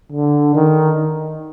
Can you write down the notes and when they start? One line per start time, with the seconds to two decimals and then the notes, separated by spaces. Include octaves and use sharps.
0.12 D3
0.55 D#3